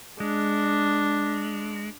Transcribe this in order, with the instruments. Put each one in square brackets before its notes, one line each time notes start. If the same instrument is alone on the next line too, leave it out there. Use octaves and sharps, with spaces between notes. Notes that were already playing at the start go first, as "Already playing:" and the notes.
[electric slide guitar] G#3 [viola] D4